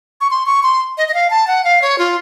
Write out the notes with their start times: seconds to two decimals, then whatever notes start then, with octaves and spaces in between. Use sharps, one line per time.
0.21 C#6
0.31 C6
0.46 C#6
0.63 C6
0.98 D#5
1.08 D#5
1.14 F5
1.30 A5
1.47 F#5
1.64 F5
1.82 C#5
1.98 F4